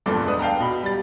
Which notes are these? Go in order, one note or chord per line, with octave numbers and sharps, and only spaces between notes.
G1 E2 G2 A#2 A4 D6
E1 G#3 D4 B4 D#6
F5 G5 A5 A#5
B2 B5
G3 A6